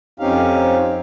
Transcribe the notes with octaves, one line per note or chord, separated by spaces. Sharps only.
F2 C4 C#4 D#4 G4 F5